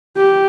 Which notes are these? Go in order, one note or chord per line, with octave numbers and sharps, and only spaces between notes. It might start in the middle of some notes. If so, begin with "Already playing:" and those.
G4